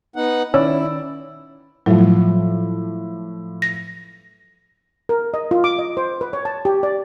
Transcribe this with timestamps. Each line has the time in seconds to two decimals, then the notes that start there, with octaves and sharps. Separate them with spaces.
0.16 B3 D#4 F#5
0.54 D#3 C#4 E4 D5 E6
1.86 A2 F3 F#3
3.62 A#6
5.09 A#4
5.34 D#5
5.51 F4
5.64 D6
5.79 D#5
5.97 C5
6.21 B4
6.33 C#5
6.45 A5
6.65 G4
6.83 D5